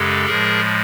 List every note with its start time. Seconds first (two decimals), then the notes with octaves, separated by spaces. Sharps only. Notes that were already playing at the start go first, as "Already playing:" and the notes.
Already playing: F#2 C#3 G#3 G4 A4
0.26 A2 F3 G#3 G#4 A#4